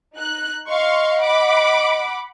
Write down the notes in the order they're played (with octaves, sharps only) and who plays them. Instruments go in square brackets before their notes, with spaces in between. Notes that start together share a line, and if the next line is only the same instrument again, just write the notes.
[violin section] D#4 F#6
[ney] D#5 [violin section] F5 C6 C#6
[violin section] F#5 B5 D6